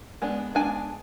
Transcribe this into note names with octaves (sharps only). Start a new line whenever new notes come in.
G#3 B3 D4
G#3 B3 D4 G#5